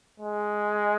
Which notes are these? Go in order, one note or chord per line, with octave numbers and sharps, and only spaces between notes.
G#3